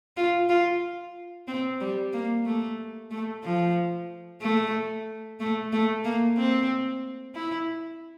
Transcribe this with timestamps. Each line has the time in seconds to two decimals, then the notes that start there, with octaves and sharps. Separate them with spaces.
0.17 F4
0.49 F4
1.48 C4
1.81 G3
2.13 A#3
2.46 A3
3.11 A3
3.44 F3
4.41 A3
5.40 A3
5.73 A3
6.04 A#3
6.37 C4
7.35 E4